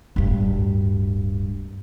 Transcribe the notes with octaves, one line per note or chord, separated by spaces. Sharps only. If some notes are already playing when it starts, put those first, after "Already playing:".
D1 G2